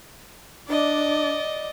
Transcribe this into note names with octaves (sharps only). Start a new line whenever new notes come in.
D4 D5 D#5